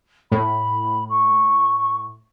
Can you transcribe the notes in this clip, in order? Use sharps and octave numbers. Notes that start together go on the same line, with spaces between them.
A2 B5
C#6